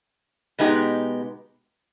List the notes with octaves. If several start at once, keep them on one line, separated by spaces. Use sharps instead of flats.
B2 G#3 B3 D#4 G4